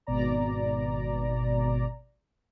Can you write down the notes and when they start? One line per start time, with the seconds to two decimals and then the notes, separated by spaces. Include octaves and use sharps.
0.07 G#1 B2 D5 A#5